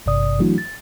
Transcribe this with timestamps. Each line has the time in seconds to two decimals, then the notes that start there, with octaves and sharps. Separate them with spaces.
0.06 G#1 G2 C3 D5 D#6
0.39 E3 F#3 A3 D4 E4 F#4
0.58 A6